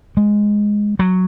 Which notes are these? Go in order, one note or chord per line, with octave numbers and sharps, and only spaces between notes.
G#3
F#3